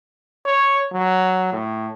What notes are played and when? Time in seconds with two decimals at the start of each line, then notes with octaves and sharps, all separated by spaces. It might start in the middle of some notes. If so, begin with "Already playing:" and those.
0.46 C#5
0.93 F#3
1.52 A2